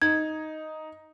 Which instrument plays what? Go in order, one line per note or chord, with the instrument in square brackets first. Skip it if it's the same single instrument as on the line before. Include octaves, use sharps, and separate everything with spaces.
[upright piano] D#4 [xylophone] G#6